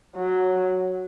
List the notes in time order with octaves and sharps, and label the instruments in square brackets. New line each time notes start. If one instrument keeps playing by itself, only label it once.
[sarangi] F#3